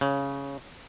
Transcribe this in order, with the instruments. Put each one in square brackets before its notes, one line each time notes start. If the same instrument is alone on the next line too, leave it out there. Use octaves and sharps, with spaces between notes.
[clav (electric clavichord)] C#3